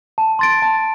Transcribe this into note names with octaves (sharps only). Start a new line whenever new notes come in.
A5
C6 A6 D7
A5